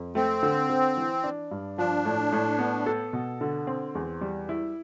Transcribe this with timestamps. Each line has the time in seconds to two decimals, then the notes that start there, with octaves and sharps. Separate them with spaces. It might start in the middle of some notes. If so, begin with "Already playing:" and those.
Already playing: F2
0.15 A3 C4
0.43 D3
0.70 D3
0.97 E3
1.24 D4
1.51 G2
1.78 F3 D4
2.05 A2
2.32 A2
2.59 B3
2.86 A4
3.13 B2
3.41 D3
3.67 C4
3.95 E2
4.21 G3
4.49 E4